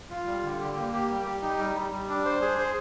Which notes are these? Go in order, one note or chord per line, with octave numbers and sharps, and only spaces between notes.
F4
G3
D3
G4
A#3
G4
G3
G4
D#4
G3
G3
G3
D4
C5
G#4
C5